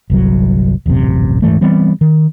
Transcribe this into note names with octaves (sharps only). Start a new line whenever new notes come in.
G1 C2 F#3
D#1 A1 F#2 C3
D#1 G#2 E3 A3
E3 G3 B3 C4
D#3